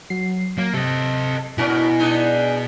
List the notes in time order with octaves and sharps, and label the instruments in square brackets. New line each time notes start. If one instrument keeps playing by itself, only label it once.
[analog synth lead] F#3 [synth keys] C7
[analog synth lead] F#3 [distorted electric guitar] A#3
[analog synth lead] C3 [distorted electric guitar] A4 D#5
[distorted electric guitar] B2 [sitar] C#4 F#4 A#4 [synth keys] E4 [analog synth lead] G#5
[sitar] G#3 D4 D#4